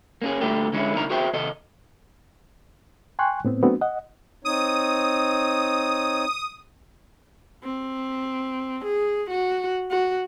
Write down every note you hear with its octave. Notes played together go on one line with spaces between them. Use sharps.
A#3 C#4 G#4
D2 A#2 D3 G3 A3 G4
D3 G#3 C#4 E4
C2 D3 A#3 D#4 E4 A#5
F#4 G#4 C5 E5 G5
D#2 C3 A4 D#5
G5 G#5 C6 C#6 F#6
A2 B3 C4
F#3 A3 B3 C4 D4 F#4
D#5 F#5
C4 D#4 C#5 D#6
C4
G#4
F#4
F#4